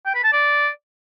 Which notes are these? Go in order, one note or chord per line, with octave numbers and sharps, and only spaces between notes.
G5
B4
A5
D5